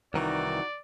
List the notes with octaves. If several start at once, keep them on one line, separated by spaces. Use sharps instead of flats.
C2 D#3 E3 D#4 E4 F#4 D5